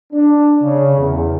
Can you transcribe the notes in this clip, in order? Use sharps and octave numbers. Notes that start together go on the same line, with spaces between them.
D4
C#3
E2